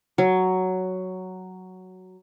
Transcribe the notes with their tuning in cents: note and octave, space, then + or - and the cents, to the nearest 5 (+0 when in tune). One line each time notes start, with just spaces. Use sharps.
F#3 +5